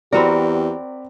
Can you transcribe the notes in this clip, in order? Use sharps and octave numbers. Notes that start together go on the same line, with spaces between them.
E2 C4 F#4 G4 A#4 D5 A#5 B5